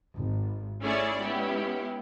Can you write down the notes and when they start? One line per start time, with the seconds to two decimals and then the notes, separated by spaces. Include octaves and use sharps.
0.16 G#1
0.81 A3 C#4 E4 G#4 C#5 D5
1.21 G#3 B3 C#4 E4 G4